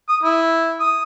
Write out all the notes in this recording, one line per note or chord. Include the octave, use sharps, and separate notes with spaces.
D#6
E4
D#6